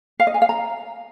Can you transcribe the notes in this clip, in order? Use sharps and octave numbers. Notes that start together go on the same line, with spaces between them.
F5
D#5
G#5
F5
A#5